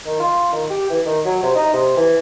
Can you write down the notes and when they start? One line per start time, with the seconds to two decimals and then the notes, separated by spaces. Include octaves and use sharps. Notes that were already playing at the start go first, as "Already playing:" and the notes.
0.06 D#3
0.20 F4
0.53 D#3
0.70 G4
0.90 E3
1.06 D#3
1.25 F#3
1.43 C3
1.55 D#4
1.73 C3
1.97 E3